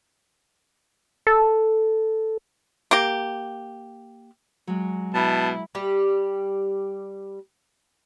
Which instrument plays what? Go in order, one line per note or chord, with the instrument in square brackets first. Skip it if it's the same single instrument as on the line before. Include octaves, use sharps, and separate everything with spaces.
[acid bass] A4
[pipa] A#3 G4
[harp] F#3 G#3
[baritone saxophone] B2 [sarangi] E4 [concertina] A5
[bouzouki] G3 G4